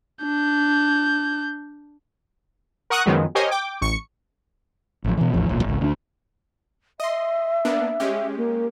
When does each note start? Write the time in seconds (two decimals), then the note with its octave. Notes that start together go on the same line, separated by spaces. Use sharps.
0.22 D4 G6
2.90 A#4 F#5 C#6 D#6 F#6
3.06 F#2 D#3 F3 F#3 G#3 B3
3.35 G4 A#4 C5 C#5 D#5 G#5
3.51 G5 D6
3.81 A1 C#6 C#7
5.04 A1 F3
5.17 B2 E3
5.33 A1 E2 F3
5.49 D1 B1 A#2
5.65 G#1 C#2
5.81 D2 D4
7.00 D#5 E5 C6
7.65 A#3 B3 D4
8.00 G#3 C#4 G4
8.37 A#3